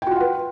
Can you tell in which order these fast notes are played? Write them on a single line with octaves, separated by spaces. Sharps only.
G5 F#4 F4 F#5 B4